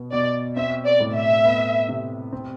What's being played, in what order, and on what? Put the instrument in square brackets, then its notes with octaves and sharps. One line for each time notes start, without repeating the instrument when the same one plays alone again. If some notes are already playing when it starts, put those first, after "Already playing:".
Already playing: [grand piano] B2 B3
[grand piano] B2 [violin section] D5
[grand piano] C4 [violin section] E5
[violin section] D5
[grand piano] A2
[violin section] E5
[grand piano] B3
C3
C4